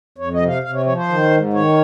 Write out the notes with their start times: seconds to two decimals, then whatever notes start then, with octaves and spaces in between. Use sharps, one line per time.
0.18 F2 C#5
0.33 D#5
0.40 C3
0.48 F5
0.63 C3 F5
0.74 C#5
0.86 F3 C#5
0.96 C5
1.08 D#3
1.31 G#2
1.53 D#3 C#5